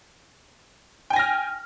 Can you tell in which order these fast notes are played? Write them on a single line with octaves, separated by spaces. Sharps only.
G5 G#5 A#6 F6